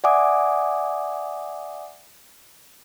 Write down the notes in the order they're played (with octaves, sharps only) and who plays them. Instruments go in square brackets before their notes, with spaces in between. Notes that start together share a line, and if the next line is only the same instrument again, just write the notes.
[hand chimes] D5 E5 F#5 G#5 D6 D#6